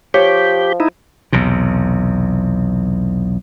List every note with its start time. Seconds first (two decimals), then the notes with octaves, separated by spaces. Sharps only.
0.14 F3 G4 C#5
0.80 D#4 E4
1.32 B1 E2 C3